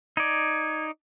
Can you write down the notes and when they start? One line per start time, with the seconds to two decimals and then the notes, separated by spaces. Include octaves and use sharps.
0.17 D#4 D5 G#6